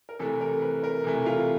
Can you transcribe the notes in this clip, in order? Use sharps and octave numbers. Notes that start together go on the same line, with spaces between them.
A#4
C3 E3 A3 A4
A#4
B4
A#4
C3 E3 A3
F4